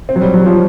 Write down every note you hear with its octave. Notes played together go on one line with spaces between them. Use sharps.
C4
F#3
G3
F#3
F3